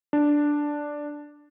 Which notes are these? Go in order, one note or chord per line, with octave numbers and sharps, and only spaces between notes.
D4